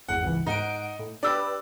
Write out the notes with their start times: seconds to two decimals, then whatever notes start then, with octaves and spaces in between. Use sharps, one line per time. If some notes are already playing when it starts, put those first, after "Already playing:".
0.08 G#1 E2 F#5
0.22 G#1 C#2 E3
0.47 G#2 D#4 F#5 D7
0.99 A2
1.23 D4 G4 B4 D5 E6